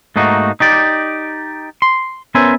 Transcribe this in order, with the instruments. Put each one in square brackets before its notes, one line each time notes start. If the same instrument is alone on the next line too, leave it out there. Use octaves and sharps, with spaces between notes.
[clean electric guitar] G#2 A3 A#3 D#4 F#4
D#4 G4 D5
C6
B3 C#4 A#4 C5 E5 G#5